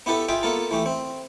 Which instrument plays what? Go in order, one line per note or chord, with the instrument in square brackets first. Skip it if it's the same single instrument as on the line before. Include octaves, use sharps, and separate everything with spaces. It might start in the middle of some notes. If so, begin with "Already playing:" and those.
[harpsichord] B3 E4 G4 A4 B4
F4 G#4 E5 G5
A#3 B3 F4 A4
E3 A3 G4
C4